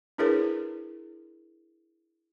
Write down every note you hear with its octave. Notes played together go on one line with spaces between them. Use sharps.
D4 E4 G#4 A#4 B4 C#5